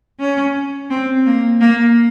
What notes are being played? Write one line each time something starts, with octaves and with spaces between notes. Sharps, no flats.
C#4
C4
A#3
A#3